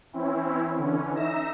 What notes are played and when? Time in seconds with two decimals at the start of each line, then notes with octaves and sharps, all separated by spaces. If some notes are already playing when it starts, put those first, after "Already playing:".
0.13 E3 C4 C#4 E4
0.77 D3 E3 C#4
1.13 D#4 E5 A#6 E7